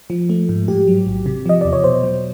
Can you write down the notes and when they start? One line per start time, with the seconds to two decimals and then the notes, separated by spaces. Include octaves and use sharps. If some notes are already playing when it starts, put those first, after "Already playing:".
0.10 F3
0.29 A3
0.49 G#2
0.68 A2 G4
0.87 F#3
1.07 A1
1.26 C3
1.46 F3 D#5
1.61 E2 D5
1.73 C#5
1.84 B2 C5
2.03 F#3